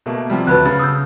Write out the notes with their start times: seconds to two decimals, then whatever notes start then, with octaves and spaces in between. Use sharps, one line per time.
0.06 B2 A3 A#3
0.30 C3 F3 G3
0.47 D2 F#3 B4 A5 B5 F#6
0.66 C#3 A6
0.79 D#6 E6 G6